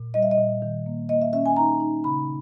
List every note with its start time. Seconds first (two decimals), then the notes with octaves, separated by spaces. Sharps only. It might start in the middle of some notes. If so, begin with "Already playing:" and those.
Already playing: A#2
0.14 G3 D#5
0.23 E5
0.31 D#5
0.38 A#2
0.62 D#3
0.86 A#3
1.09 A#3 D#5
1.22 E5
1.33 C#4 E5
1.46 G#5
1.56 D#4 A#5
1.80 D#4
2.04 C#3 B5